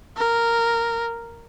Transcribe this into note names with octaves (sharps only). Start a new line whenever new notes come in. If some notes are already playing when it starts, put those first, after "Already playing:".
A#4